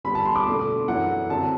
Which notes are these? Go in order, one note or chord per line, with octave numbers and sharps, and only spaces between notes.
D3 G3 B3 B5
A5
C6
D6
B2 A3 D4
F#2 E3 A3 E4 F#5
F#2 D3 F#3 C4 A5